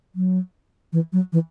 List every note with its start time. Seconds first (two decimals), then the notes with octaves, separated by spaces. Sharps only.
0.15 F#3
0.93 E3
1.13 F#3
1.33 E3